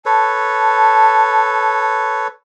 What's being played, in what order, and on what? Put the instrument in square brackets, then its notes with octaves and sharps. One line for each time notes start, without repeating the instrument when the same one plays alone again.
[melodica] A4 B4 C#5 [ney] A5